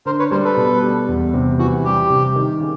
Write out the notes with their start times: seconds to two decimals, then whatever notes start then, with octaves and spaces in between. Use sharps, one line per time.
0.06 D3 A#4 C5
0.19 B4 C#5
0.31 G3 A#4 C5
0.44 A4 B4
0.57 B2
0.83 G3
1.09 E2
1.34 C3
1.59 E3 F#4
1.85 G3 G4
2.10 C3
2.36 D#3
2.60 C#3